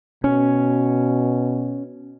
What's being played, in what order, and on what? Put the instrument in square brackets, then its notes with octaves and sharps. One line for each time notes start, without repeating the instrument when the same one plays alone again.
[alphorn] B2 [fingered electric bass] C#4